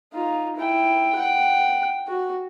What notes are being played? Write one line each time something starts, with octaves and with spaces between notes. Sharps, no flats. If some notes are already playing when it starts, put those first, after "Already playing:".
D#4 F4
E4 G5
F#5 G5
F#4